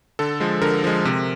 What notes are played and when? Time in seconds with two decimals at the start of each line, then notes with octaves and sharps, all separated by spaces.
0.19 D3 A4
0.40 F3 G#3
0.62 D3 A#4
0.84 F3 G#3
1.05 C3